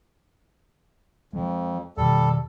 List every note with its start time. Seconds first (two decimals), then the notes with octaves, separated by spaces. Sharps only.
1.33 F2 F3 G#3
1.97 F2 B2 D#3 G3 A4